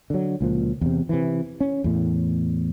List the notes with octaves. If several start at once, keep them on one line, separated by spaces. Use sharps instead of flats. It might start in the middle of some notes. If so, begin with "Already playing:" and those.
D3 F#3
C#2 A#2 F3
E2 C3
C3 E3
C#4
E2 A2